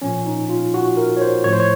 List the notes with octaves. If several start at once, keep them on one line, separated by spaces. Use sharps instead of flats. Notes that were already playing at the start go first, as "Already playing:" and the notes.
A#2 F3 C#4
D#4
F4
F#4
A#4
C#5
C5
A2 F3 C#5
C5
C#5